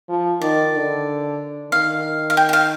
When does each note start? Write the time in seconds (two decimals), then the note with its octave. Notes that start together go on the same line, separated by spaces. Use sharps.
0.09 F3
0.41 D#3 D5
0.75 D3
1.71 D#3 F5
2.30 F5
2.37 G5
2.49 G5
2.53 F5